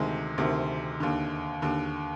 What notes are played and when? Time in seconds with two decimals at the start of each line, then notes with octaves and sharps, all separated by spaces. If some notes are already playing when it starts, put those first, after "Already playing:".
Already playing: D2 C3 D#3 G#3
0.38 D2 C3 D#3
1.00 D#2 D3
1.62 D#2 D3